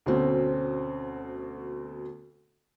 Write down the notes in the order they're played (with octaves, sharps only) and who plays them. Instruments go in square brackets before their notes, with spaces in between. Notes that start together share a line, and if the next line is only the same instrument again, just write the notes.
[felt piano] D2 B2 C4 C#4